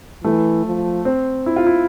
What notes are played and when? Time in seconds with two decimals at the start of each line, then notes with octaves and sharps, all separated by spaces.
0.24 E3 A3
0.66 F3
1.05 C4
1.46 E4
1.56 F4
1.67 E4